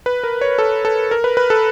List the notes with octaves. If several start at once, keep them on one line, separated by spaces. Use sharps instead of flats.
B4
A#4
C#5
A4
A4
A#4
B4
B4
A4